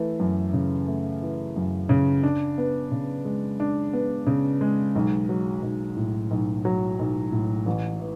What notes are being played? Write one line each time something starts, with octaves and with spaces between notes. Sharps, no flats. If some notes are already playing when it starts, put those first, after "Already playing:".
Already playing: E3 A3
F#2
C#3
A3
E3
F#2
C#3
D4
B3
C#3
G#3
D4
B3
C#3
G#3
B1
F#3
B1
A2
B1
F#3
B1
A2
A1
E3